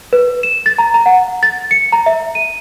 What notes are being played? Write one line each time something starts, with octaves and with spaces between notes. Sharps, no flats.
B4
E7
A6
A#5
A#5
F#5
A6
C#7
A#5
E5
D#7